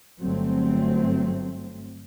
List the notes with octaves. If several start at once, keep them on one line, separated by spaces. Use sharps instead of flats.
G1 F#3 A3 C4